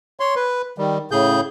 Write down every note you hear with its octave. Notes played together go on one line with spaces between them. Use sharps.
C#5 C6
B4
D#3 G3
A2 C#3 G#4 G6